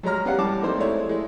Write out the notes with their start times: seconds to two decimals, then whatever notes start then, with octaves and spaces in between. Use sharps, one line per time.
0.03 F#3 G#3 C#5 A#5 F6
0.25 B3 C#4 G4 D5 F5 F#5
0.38 E3 G3 A5 D6
0.62 A3 A#3 C4 D#4 C5 D5
0.77 G#3 A3 E4 C#5 D5
1.09 G#3 E4